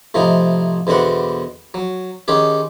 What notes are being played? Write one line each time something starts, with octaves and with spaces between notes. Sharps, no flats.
A2 C3 F3 D#4
E2 B2 D3 C4 F#5
F#3
D#3 G#3 C#4 G4